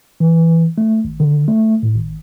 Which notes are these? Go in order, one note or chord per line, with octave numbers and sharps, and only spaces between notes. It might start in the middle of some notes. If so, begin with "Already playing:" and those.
E3
A3
G#1
D3
A3
A2
G#1